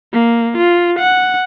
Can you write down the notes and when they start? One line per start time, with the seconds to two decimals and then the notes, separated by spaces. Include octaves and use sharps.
0.13 A#3
0.58 F4
0.99 F#5